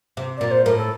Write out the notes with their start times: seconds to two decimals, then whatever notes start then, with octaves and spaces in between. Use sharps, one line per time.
0.17 C3
0.38 A#2 D5
0.51 C5
0.64 A2 A#4
0.77 A4